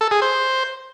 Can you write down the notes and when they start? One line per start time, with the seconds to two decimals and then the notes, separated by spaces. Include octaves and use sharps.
0.01 A4
0.11 G#4
0.22 C5